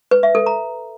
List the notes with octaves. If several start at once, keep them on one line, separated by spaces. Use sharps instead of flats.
B4
E5
A4
A#5